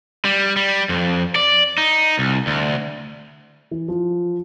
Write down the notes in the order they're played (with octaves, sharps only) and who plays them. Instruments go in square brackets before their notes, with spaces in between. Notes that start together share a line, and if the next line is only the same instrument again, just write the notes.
[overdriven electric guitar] G3
G3
F2
D5
D#4
C2
D2
[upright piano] E3
F3